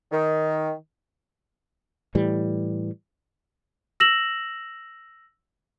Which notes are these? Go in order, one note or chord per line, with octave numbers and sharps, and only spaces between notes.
D#3
A2 E3 G3
E6 A#6 E7 F#7